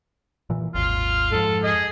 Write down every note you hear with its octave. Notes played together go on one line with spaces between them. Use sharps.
A#2 E3
G#1 D#2 F4
F2 G#2 A4
G#4 D#5